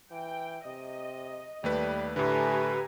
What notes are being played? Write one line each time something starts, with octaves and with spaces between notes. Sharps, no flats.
E3 G5
C3 D#5
D#2 G3 A3 B4
A2 D3 A3 G4 B4 G#5 A#5